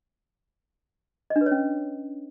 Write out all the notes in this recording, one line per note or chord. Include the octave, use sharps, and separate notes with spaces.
D#5
D4
B4
C#5
C#4